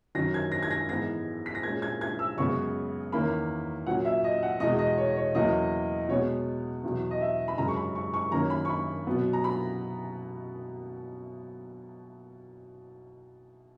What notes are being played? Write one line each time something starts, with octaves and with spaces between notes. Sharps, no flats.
F#2 D#3 F#3 C#4 A#6
G#6
A#6
G#6
A#6
G#2 E3 G#3 B3 A#6
B6
A#6
A#2 G#3 C#4 G#6
G#6
G#6
E6
F#2 C#3 G#3 B3 C#6
E2 D#3 A#3 C#4 B5
A#2 F#3 C#4 F#5
E5
D#5
F#5
E2 B2 G#3 D#5
D#5
C#5
C#5
E2 C#3 F#3 A#3 D#5
B2 G#3 B3 C#5
E2 B2 F#3
D#5
E5
B5
F#2 C#3 G#3 A#5
C#6
B5
C#6
C#6
F#2 D#3 A#3 C#4 A#5
B5
C#6
B5
B2 F#3 B3
A#5
B5